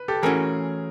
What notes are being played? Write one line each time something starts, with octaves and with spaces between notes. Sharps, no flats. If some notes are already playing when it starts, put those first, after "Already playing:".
Already playing: B4
G4 A4
E3 A3 C#4 F#4 G#4 A#4